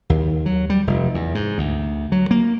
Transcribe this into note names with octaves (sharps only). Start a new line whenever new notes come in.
D#2
F#3
G3
F1
E2
G#2
D2
F#3
A#3